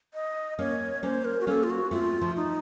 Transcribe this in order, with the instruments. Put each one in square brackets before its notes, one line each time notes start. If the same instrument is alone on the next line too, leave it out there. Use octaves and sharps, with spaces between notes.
[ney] D#5
[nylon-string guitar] A#3 C#4 [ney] C#5
[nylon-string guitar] A#3 C#4 [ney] C5
[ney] A#4
F#4
[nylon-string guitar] A#3 C#4 [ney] A4
[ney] F4
F#4
[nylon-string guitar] A3 C4 [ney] F4
[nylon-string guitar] F3 A3
[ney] D#4